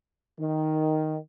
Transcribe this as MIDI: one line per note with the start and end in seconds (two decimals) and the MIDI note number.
0.38 1.16 51